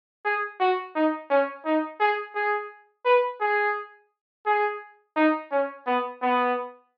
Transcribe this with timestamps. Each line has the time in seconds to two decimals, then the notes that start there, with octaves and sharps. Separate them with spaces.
0.25 G#4
0.60 F#4
0.95 D#4
1.30 C#4
1.65 D#4
2.00 G#4
2.35 G#4
3.05 B4
3.41 G#4
4.46 G#4
5.16 D#4
5.51 C#4
5.86 B3
6.22 B3